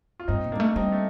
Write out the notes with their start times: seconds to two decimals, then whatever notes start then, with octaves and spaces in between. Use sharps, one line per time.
0.20 F4
0.28 G2 C4 D#4
0.44 A#2
0.52 G3 A#3 D4
0.60 A3
0.76 G3 C4 D#4
0.92 A3